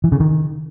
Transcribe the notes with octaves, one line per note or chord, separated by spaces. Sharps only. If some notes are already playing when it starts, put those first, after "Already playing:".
E3
C#3
D#3